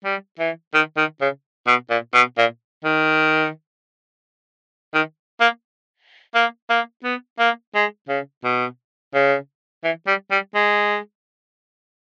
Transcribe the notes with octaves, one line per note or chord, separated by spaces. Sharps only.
G3
E3
D#3
D#3
C#3
B2
A#2
B2
A#2
D#3
D#3
A#3
A#3
A#3
B3
A#3
G#3
C#3
B2
C#3
E3
G3
G3
G#3